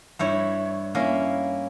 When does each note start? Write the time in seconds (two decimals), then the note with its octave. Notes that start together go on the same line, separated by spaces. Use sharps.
0.19 G2 E4 C#5
0.95 A#3 C#4 E4